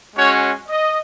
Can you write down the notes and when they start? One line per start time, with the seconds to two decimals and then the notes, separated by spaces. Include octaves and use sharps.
0.16 G#3 C#4 F#4 C#5
0.68 D#5